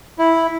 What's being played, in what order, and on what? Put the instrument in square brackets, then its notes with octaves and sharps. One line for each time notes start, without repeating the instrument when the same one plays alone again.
[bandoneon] E4